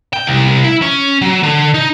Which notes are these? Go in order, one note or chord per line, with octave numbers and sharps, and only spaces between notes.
G5
C2
E4
C#4
F#3
D3
D#4